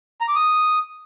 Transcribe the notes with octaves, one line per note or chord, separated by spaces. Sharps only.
A#5
D6
D#6